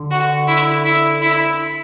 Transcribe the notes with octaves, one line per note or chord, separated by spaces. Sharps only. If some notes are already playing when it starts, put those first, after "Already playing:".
Already playing: D3
F#4
E4
E4
E4